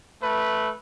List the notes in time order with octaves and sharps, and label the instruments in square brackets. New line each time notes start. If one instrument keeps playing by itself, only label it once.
[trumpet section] A3 B4